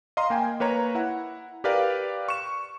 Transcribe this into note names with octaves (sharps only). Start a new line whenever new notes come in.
D#5 F5 A#5 C6
A#3 G5 G#5
A#3 B4 C#5 A#5
E4 F#5
G4 A#4 B4 D5 F5
C#6 E7